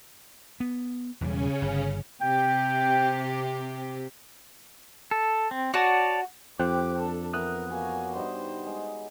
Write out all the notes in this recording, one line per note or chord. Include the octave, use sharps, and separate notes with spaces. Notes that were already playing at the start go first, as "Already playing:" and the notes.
B3
E1 E2 C#3 G3 C#4
G1
C3 G4 G5
A4
C4
F#4 C#5 D5 A5
F2 G4 C5 G5 D6 F#6
D4 A4
E3 B3 A#4 D#6 F#6
A#3 F#4 C#5 G#5
G2 G3 D#4 C5
G#3